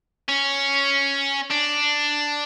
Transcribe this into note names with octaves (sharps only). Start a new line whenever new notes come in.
C#4
D4